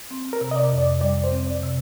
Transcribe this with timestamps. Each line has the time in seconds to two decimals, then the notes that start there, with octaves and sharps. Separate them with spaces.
0.11 C4
0.33 A#4
0.41 C3
0.51 D#5
0.56 D5
0.71 F2
0.78 D5
1.01 G3 D5
1.24 C5
1.32 C4
1.47 D5
1.63 C3